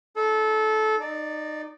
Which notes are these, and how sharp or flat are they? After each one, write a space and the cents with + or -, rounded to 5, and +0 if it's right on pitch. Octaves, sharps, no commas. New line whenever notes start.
D#4 +0 A4 -20
D#4 -25 D5 +0